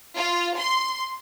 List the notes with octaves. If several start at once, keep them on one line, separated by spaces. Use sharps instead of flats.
F4
C6